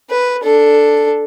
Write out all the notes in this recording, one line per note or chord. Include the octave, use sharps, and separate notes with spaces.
B4
D4 A4